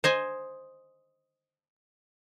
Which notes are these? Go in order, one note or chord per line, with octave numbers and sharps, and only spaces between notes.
C5 D#5 G#5